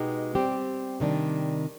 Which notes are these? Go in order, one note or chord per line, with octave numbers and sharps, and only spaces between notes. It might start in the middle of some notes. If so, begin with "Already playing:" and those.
Already playing: B2 G#3 B3 D#4 G4
G3 C4 G4
C3 D#3 G3 D4